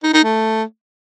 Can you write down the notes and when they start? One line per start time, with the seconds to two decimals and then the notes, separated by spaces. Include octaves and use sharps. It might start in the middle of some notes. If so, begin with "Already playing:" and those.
0.03 D#4
0.14 D#4
0.24 A3